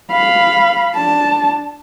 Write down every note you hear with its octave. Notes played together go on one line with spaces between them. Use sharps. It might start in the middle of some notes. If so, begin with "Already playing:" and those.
F5 B5
D4 A5